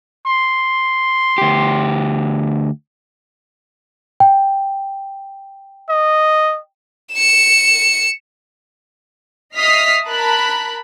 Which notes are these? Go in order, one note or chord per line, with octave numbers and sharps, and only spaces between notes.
C6
D2 G4
G5
D#5
C#7 E7
D#5 E5 D#6 F6 B6 C7
A#4 A5 B5 F#6